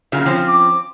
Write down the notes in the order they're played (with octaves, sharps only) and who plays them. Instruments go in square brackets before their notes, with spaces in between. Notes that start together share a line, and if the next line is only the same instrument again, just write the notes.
[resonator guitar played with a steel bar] A#2 C#3 F#3
F3 C4 C#4
[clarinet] D6